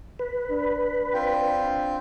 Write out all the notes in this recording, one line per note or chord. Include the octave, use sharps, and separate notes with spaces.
B4
D4
C4 F4 G5